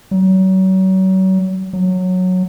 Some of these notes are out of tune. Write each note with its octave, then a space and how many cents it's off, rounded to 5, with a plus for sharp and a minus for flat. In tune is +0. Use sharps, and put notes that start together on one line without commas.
F#3 +35
F#3 -10